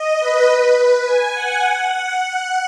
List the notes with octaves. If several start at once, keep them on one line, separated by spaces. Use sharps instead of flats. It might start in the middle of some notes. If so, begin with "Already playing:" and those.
Already playing: D#5
B4
B4
G#5
F#5
F#5